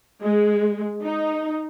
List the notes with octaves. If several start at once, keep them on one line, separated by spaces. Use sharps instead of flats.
G#3
D#4